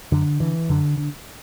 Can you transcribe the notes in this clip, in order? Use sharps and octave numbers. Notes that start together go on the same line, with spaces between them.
F#2 D3
D3 E3
F#2 D3
D3